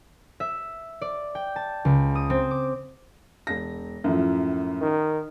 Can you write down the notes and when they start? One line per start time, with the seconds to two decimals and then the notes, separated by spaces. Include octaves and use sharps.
0.40 E5
1.01 D5
1.35 G5
1.56 A5
1.85 C#2
2.15 D#6
2.30 C4
2.51 D6
3.47 E1 A#6
4.04 F#2 A2 F3
4.81 D#3